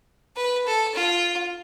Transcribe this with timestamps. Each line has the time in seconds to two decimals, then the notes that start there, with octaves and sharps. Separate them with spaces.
0.36 B4
0.67 A4
0.95 F4